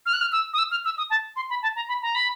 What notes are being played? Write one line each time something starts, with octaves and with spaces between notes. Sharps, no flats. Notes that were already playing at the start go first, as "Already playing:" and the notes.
F6
F#6
F6
E6
D#6
E6
F6
E6
D#6
A5
C6
B5
A5
A#5
B5
A#5
B5